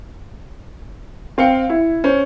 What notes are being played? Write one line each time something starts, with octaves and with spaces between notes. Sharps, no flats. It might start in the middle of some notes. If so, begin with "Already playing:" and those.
C4 F5 G5 C#7
E4
C#4 C5